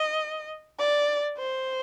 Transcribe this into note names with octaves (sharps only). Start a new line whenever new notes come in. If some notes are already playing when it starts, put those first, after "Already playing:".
Already playing: D#5
D5
C5